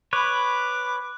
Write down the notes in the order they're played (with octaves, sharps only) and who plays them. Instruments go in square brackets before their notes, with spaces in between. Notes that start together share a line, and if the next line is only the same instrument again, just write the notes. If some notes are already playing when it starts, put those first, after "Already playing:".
[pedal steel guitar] B4 C#5 [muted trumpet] B5 [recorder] D6 [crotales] F#6